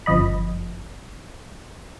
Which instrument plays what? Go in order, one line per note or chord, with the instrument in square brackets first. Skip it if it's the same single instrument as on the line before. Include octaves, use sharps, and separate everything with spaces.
[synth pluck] G1 F#2 F3 D#5 B5